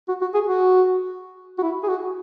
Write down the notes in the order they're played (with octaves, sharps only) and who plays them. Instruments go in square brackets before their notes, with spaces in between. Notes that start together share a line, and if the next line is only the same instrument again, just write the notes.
[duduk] F#4
F#4
G#4
F#4
F#4
E4
G#4
F#4